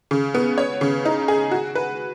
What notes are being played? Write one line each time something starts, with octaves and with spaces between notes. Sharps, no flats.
C#3
B3
C#5
C#3
D#4
G#4
F#4
B4